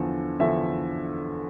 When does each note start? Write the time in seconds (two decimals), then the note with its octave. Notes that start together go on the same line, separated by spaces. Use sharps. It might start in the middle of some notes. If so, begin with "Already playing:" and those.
Already playing: E2 D3 F3 A4
0.40 E2 D3 F3 E5